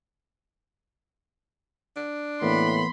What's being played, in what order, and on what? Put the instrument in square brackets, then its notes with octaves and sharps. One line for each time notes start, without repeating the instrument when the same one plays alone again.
[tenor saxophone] D4
[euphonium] A2 [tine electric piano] E3 A#3 B3 [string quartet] B5 C6